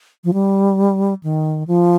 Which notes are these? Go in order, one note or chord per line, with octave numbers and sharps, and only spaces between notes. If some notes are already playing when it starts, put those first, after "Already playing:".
F3
G3
D#3
F3